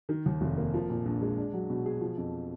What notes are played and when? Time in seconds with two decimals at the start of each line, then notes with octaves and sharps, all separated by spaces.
0.09 D#3
0.26 D#2
0.41 F1
0.58 A#3
0.74 F3
0.90 A#2
1.05 A#1
1.22 G#3
1.38 D4
1.53 F#3
1.70 B2
1.86 G#4
2.01 F3
2.17 F2